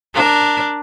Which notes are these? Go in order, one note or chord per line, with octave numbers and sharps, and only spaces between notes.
D4 A#4